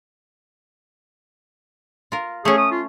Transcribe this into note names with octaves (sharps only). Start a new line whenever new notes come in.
F4 A#4
A3 C#4 G#4
D#6
F4